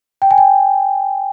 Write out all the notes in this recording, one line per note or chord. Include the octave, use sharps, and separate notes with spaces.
G5
G#5
G5